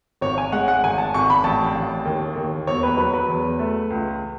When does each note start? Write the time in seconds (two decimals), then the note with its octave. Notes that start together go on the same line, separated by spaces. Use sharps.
0.21 G#1 C#5
0.38 G#5
0.52 G#3 F#5
0.68 F#5
0.83 G#1 G#5
0.98 A5
1.14 G#1 C#6
1.30 B5
1.44 A1 A5
1.75 A1
2.05 D#2
2.36 D#2
2.67 E1 C#5
2.83 B4
2.97 F#3 B4
3.14 B4
3.28 E2
3.59 A3
3.90 C#2